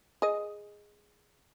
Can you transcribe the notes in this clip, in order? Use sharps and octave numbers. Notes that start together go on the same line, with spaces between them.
G#4 D#5